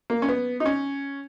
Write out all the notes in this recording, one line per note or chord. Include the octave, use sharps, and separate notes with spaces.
A#3
C#4
B3
D#4
C#4